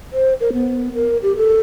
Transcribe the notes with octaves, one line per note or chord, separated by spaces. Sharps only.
C5
A#4
B3
A#4
G4
A4